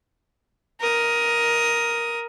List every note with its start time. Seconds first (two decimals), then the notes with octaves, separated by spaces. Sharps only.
0.80 A#4 D#6